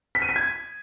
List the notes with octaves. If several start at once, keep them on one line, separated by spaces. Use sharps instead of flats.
B6
D#7
B6
G#6